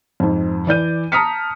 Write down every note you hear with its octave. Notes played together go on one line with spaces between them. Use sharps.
F2 G#2
E3 D5 G6 D#7
A5 A#5 D#6 F6 B6 C#7